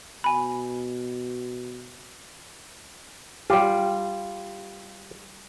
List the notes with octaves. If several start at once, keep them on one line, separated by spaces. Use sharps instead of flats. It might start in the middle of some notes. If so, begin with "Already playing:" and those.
B2 G#5 B5
G3 F4 G4